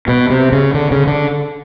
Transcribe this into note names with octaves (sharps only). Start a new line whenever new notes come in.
B2
C3
C#3
D3
C#3
D3